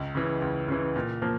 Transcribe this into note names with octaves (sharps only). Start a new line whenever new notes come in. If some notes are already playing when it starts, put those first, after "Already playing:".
Already playing: C#2
C#3 E3
C#2
C#3 E3
A#2
F3 A#3